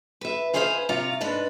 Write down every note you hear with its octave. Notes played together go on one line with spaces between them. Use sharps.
B4 E5
F4 G#4 B4 C5 D5 F5
C3 F4 C#5 A#5
G#2 D4 B4